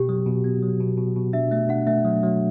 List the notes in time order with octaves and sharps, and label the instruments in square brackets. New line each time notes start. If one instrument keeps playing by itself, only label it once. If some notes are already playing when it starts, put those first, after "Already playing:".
Already playing: [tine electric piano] B2 [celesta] G4
[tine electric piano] F#3
B2
B3
F#3
B2
B2
B2
[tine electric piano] D4 [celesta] E5
[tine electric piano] A3 [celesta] E5
[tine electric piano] D4 [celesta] F#5
[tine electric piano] A3 [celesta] E5
[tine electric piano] F#3
F#3